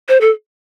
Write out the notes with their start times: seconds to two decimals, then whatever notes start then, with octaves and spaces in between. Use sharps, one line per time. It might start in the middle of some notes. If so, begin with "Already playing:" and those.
0.09 C5
0.21 A4